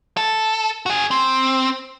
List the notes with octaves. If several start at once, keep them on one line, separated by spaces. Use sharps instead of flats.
A4
F#4 G#4
C4